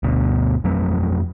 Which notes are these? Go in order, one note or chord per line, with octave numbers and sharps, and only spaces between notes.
G1 D2 B2
F2 F#3 A3 C4